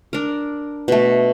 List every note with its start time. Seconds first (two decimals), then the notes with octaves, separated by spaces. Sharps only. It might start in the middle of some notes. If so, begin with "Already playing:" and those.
0.13 D4 A#4
0.88 B2 A3